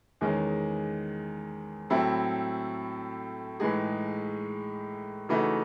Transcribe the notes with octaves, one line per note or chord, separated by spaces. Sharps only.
E2 D#3 G#3 C#4 G#4
A2 F#3 C4 E4 A4
A2 E3 G#3 D#4 G#4
C#3 E3 A3 D#4 F#4